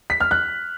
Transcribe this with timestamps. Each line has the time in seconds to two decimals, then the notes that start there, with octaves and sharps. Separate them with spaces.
0.10 B6
0.20 F6
0.31 F#6